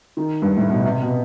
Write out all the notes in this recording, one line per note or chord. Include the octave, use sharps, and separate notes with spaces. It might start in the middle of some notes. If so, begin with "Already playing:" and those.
D#3
G2
A2
B2
C3
B2